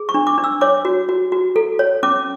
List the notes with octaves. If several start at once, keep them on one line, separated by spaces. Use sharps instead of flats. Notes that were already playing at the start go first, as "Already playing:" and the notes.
Already playing: G#4
C#6
D4
D6
D4
E6
C#5 D6
F#4
F#4
F#4
A4
C#5
C#4 D6